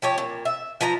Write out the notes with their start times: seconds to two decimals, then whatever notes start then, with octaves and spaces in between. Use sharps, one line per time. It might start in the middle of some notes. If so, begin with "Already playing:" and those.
0.02 F3 G4 C#5
0.18 A#2
0.45 E5
0.81 F3 B4 A#5